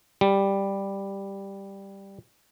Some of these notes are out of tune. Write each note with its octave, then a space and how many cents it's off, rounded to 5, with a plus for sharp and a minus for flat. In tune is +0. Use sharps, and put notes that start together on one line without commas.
G3 +5